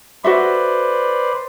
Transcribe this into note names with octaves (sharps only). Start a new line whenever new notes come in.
F#4 A4 B4 C5 D5 E5